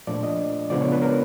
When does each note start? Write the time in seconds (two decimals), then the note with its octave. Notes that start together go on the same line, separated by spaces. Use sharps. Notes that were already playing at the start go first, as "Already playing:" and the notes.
0.07 A#2 F3 A3 D4 D5
0.23 D#5
0.70 C#3 F3 G#3 B3 D4 D5
0.81 C#5
0.92 B4
1.02 A#4